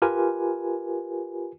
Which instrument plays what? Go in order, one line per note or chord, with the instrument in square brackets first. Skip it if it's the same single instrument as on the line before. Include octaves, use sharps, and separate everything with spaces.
[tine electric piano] F4 G4 A#4 B4 G#5